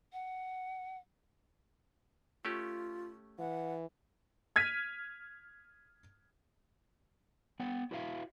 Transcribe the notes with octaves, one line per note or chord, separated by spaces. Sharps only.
F#5
A3 C#4 F4 G4
E3 F#5
F6 G#6 B6 D#7
B3 C#5 F#5 G5
E4 F#4 B4 C#5 E5 F5